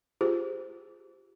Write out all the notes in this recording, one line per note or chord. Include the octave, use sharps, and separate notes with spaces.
F4 G4 G#4 C5